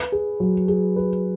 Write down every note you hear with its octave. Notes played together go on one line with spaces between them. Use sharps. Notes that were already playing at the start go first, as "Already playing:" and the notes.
Already playing: B4
G#4
F#3
G#4
B4